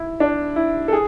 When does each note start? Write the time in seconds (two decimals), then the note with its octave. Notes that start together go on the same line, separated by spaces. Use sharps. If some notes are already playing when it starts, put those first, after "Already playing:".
Already playing: E4
0.20 D4
0.56 E4
0.88 A4
0.93 G#4